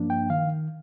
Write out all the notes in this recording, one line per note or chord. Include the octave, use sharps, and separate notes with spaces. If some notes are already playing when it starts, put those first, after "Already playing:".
Already playing: G2 F3 A#3 D4
G5
D#3 F5